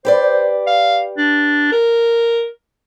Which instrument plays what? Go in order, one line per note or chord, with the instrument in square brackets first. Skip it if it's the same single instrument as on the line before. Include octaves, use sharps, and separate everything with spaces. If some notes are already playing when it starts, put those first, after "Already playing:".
[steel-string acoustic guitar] G4 B4 D5 [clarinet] C5
[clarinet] F5
D4
A#4